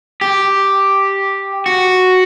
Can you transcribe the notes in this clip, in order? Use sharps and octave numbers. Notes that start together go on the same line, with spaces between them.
G4
F#4